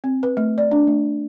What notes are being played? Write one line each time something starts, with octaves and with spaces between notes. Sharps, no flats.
C4
B4
A3
D5
D4
A3